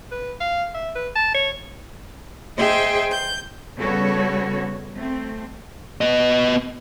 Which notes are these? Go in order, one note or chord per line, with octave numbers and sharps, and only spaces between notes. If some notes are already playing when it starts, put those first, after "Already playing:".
B4
F5
E5
B4
A5
C#5
G#4 C5 D#5 E5 G5
G6
C#3 G3 B3 F#4 A4 C#5
A3 C4
B3 D#5